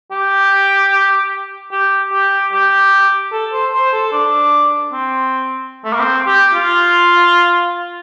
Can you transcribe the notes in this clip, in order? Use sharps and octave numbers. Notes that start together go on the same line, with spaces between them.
G4
G4
G4
G4
A4
C5
C5
A4
D4
C4
A3
A#3
C4
G4
F4